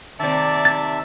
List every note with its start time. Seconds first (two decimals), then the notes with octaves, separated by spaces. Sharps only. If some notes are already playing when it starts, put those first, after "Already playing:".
0.20 C3 D#3 D5 E5 A5
0.65 A6